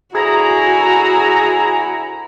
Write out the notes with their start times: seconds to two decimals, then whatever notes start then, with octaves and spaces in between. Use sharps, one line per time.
0.15 D2 E4 F#4 G#4 A#5